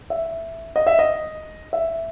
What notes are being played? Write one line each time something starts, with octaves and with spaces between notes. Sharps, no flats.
E5
D#5
E5
D#5
E5